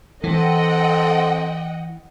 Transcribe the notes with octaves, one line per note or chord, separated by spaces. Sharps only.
E3 C4 A4 D#5 F#5 G5